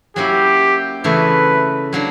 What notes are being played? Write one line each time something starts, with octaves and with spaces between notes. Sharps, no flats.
F#3 A#3 C#4 E4 G4
C#3 E3 A3 B4
F#3 A#3 D4